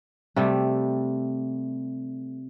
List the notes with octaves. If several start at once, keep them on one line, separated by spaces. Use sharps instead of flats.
C3 G3 A3